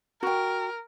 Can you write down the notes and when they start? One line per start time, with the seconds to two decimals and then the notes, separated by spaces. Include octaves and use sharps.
0.23 F#4 A#4 G5